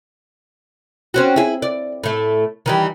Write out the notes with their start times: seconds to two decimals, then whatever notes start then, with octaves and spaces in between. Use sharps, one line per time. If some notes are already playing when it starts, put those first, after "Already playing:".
1.14 C4 C#4 F#4
1.36 E4 G#4
1.62 D5
2.04 A2 A3
2.66 D#3 E3 G3